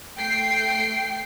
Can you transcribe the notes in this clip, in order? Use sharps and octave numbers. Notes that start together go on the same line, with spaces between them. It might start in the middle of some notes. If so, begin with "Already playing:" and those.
A3 G5 C7